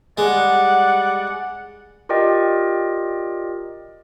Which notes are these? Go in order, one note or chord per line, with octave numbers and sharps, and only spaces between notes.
G3 G#3 D5 F#5
F4 G4 A#4 D5 D#5 G5